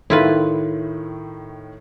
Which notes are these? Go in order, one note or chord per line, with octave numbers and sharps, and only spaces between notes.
A2 D#3 A3 E4 F4 B4